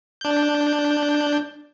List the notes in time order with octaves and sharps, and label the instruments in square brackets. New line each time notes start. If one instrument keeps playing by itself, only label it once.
[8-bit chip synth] D4 G6